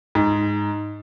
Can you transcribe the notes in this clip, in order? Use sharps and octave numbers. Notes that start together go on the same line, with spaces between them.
G#2